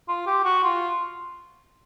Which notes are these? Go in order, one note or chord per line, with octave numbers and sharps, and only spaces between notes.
F4
G4
F#4
F4